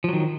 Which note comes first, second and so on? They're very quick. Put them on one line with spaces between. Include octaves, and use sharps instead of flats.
F3 F#3 D#3